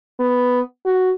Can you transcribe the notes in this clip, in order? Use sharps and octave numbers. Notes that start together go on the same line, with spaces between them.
B3
F#4